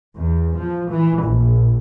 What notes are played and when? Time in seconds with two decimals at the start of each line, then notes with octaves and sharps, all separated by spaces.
0.16 E2
0.56 F3
0.91 E3
1.23 A#1